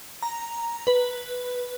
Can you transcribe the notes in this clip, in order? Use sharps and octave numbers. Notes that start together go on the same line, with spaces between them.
A#5
B4